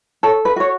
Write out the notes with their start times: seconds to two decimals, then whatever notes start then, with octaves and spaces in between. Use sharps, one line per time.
0.23 A4 C#5
0.45 B4
0.56 F#4 C#5